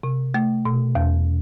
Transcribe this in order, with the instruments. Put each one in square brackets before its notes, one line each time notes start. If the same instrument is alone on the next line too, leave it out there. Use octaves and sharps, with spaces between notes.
[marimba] C3
A3
B2
E2